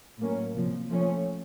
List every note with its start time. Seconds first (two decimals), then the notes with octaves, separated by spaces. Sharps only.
0.18 A2 F#3 A#3 C#4
0.53 C2 A#2 F3
0.90 F3 A3 C#4